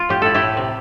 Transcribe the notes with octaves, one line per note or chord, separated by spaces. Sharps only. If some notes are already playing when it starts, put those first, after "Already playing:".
Already playing: F4
A2 G4
E4 A4
E4 G4
A2
C3